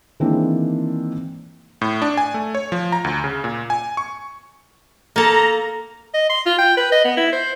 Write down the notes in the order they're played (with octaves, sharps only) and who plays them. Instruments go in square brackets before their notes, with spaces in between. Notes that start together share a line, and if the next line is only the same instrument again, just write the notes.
[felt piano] D#3 E3 G#3 A#3 C4 D4
[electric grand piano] A2
D4
G#5
A3
C#5
F3
A#5
D2
C#3
A#2
G#5
C#6
[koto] A#3 A4 [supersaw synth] A#5
[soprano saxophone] D#5
C6
F4
G5
B4
D#5
B3
E4
C5